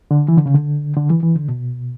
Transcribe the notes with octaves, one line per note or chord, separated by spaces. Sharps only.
D3
E3
D3
C#3
D3
D3
E3
E3
D3
B2